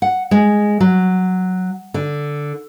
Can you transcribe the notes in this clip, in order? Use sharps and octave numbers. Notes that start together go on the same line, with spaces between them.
F#5
G#3
F#3
D3